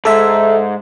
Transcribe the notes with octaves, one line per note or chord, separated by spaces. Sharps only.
G#2 A4 E5